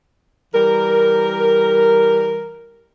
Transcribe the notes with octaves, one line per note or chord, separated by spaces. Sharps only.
E3 G3 A#4